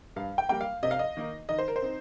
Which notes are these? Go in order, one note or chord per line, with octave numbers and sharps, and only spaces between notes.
G2 F5
G5
G3 A#3 G5
F5
C3 D#5
F5
D#5
D#3 A#3 D#4
D#3 D#5
C5
A#4
C5
C4 D#4